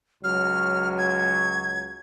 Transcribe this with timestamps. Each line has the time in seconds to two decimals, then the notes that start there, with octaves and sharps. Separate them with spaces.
0.24 C#2 F#3 F6
0.98 G#6